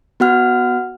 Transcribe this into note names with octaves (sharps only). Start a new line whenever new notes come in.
B3 F#4 F#5 F6